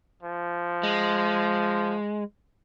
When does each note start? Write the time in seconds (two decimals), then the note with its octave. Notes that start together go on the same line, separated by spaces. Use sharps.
0.23 F3
0.83 G#3